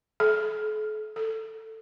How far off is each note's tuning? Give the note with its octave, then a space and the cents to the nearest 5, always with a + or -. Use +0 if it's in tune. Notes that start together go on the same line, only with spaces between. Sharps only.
A4 -45
A4 +15